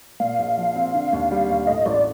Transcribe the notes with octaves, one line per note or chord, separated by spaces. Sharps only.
A#2 F5
A#1
F3
C4
D3
D#2
G3
D#2
A2 D#5
A1 D5